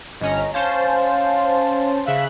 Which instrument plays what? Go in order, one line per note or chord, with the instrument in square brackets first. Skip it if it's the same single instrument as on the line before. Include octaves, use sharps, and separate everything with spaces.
[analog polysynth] G1 C#4 A#5 [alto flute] D#5
[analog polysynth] C#4 C5 A5 [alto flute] F5
[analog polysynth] C#3 E5 F#6 [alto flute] F5